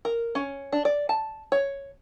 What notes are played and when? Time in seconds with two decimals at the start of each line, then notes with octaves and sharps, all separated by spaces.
0.05 A#4
0.35 C#4
0.72 D4
0.85 D5
1.09 A5
1.52 C#5